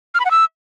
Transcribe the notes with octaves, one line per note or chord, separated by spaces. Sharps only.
F6
B5
F#5
E6